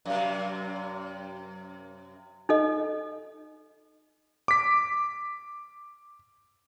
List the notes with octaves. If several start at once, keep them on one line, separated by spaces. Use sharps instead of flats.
F#2 C3
D#4 A4 D#5
D6 B6